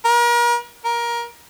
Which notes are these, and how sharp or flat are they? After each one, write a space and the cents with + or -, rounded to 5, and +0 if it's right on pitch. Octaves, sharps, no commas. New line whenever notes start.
A#4 +40
A#4 +20